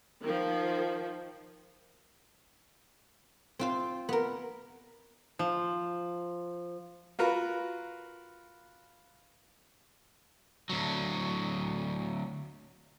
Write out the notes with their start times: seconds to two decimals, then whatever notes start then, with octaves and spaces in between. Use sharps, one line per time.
0.23 D#3 F3
3.59 C4 F4 C5
4.09 B3 A#4
5.39 F3
7.19 F4 F#4 A#4 B4
10.69 D2 F#3